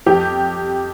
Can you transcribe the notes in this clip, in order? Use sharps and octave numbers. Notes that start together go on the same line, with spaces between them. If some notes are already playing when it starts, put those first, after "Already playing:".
F2 G4